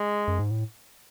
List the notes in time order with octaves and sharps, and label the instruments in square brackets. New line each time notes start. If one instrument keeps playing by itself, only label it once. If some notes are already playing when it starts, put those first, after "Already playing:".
Already playing: [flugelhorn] G#3
[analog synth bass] F#2
G#2
A2